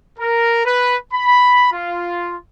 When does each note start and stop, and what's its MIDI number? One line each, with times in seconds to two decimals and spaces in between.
0.19 0.63 70
0.65 0.95 71
1.13 1.70 83
1.72 2.35 65